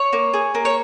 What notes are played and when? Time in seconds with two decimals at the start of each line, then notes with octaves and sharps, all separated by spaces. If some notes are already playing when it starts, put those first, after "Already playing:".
Already playing: C#5
0.13 A#3
0.34 G#4
0.55 A#3
0.65 C#5